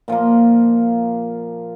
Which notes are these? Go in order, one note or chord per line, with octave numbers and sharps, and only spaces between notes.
A#2 F3 A#3